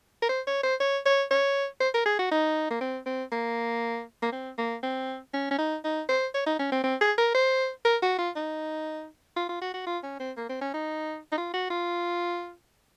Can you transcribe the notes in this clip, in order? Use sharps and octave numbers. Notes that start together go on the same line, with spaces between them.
A#4
C5
C#5
C5
C#5
C#5
C#5
C5
A#4
G#4
F#4
D#4
A#3
C4
C4
A#3
A#3
C4
A#3
C4
C#4
C#4
D#4
D#4
C5
C#5
D#4
C#4
C4
C4
G#4
A#4
C5
A#4
F#4
F4
D#4
F4
F4
F#4
F#4
F4
C#4
C4
A#3
C4
C#4
D#4
D#4
F4
F#4
F4